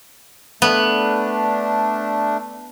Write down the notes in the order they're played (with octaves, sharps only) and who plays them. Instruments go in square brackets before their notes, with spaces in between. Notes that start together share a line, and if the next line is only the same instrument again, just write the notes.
[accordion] A3 D4 [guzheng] B3